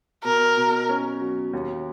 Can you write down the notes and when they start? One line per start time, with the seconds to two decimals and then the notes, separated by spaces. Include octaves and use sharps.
0.24 B2 A#4
0.57 B2
0.89 C#4
1.21 F#3
1.53 D#2